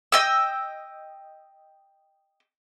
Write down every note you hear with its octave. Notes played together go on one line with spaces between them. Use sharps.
D#5 G5 E6